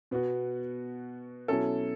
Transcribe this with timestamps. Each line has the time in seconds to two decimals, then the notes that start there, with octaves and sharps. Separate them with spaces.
0.11 B2 B3 F#4
1.48 B2 F#3 C#4 E4 A4